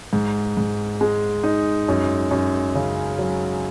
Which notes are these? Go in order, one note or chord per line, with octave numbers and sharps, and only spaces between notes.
G#2
G#2
G#3
D#4
F#2
F#2
C#3
F#3